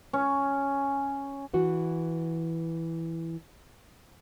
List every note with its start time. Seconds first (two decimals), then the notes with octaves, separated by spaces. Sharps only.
0.13 C#4
1.54 E3 F#4